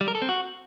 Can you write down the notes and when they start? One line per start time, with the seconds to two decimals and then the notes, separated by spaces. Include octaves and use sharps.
0.01 G3
0.08 A#4
0.15 A4
0.22 C4
0.29 F#4